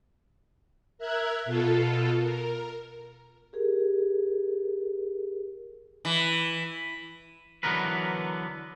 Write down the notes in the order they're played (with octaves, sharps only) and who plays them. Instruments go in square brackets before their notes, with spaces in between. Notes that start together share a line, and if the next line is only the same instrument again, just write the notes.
[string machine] A#4 E5 F#6 G#6
B2 F4 A4
A#4
[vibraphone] G4 G#4 A#4
[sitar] E3
[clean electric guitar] D3 E3 F#3 B3 A#4 B4